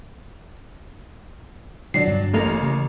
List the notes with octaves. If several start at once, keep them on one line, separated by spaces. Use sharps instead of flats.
B2 D3 F#3 D4 C7
G2
A1 A3 A#3 A#5 F7
C#3